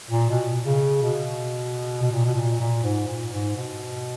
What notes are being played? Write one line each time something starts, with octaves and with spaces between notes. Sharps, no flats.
A#2
B2
C#3
B2
B2
A#2
B2
A#2
A#2
G#2
A#2
G#2
B2